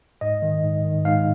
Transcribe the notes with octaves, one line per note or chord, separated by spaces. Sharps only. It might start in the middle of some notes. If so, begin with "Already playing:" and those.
G#2 D#5
D#3
G#2
D#3
G#2 F5